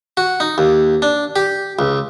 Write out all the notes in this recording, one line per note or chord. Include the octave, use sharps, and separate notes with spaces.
F#4
D#4
D#2
D4
G4
C#2